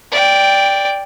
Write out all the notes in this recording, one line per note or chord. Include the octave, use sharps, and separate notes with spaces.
D5 G5